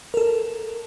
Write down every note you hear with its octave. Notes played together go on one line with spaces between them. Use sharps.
A4 A#4